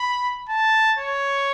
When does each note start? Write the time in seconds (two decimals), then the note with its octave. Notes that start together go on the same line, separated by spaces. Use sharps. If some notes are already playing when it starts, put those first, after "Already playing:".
Already playing: B5
0.49 A5
0.98 C#5